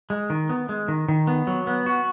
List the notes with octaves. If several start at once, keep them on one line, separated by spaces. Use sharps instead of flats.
G#3
D#3
B3
G#3
D#3
D#3
B3
F#3
B3
F#4